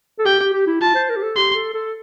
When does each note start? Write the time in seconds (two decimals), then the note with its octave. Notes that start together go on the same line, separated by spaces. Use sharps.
0.19 A4
0.25 G4 G5
0.40 G4
0.53 G4
0.67 E4
0.81 F4 A5
0.95 C5
1.09 A#4
1.16 G4
1.23 A4
1.36 G4 C6
1.55 A4
1.74 A4